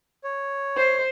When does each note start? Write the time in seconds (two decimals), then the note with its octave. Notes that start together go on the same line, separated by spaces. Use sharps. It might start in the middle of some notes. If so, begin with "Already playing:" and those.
0.24 C#5
0.77 C5